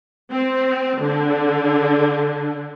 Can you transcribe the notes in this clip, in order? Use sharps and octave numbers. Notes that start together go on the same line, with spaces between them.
C4
D3